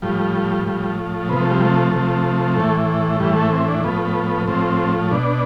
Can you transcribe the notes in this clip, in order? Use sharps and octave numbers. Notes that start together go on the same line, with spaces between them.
A2 F3 G3
A2 F3
C3 F3 B3
A3
G3
A3
C3 F3
A2 E3
A2 E3 G3
A3
C4
D4
A2 F3 B3
B3
B3
A2 F3 C4
B2 D4